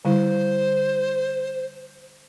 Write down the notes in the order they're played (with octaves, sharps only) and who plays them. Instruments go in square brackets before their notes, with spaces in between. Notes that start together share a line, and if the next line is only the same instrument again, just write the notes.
[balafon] D3 G3 E4 [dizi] C5